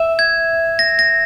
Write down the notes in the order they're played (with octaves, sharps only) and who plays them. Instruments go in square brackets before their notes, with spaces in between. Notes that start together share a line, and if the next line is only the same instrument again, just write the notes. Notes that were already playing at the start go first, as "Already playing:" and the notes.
Already playing: [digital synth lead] E5
[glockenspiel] G#6
A#6
A#6